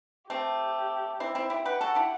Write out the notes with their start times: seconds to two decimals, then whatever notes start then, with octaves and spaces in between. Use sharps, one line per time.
0.30 A3 C4 G4
1.20 C4 E4
1.35 C4 E4
1.50 E4 G4
1.65 G4 B4 F#5
1.81 F#4 A4
1.95 E4 G4